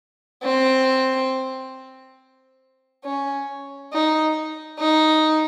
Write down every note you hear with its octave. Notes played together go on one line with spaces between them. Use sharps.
C4
C#4
D#4
D#4